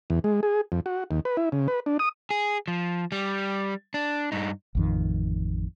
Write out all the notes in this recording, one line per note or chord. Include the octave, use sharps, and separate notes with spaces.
E2
G#3
G#4
F2
F#4
D#2
B4
E4
C#3
B4
D4
D#6
G#4
F3
G3
D4
G2 D#4
A1 F2 D#3